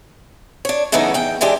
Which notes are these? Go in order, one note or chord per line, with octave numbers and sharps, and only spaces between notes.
D4 C#5
C#3 E3 F#3 A3 B3 D#4
E2 G5
G#2 E3 G#3 D4 G4